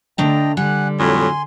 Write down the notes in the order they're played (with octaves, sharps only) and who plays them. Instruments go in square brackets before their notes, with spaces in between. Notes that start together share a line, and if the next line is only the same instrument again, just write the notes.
[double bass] D3 [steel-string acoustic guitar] A3 D4 A#5 [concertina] D#5 G5
[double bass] D3 [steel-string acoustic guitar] G3 [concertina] F#5 G#5 F#6
[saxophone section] F2 A2 F#3 [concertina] G#5 C6